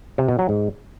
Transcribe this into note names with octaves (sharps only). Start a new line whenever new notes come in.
C3
B2
F#3
G#2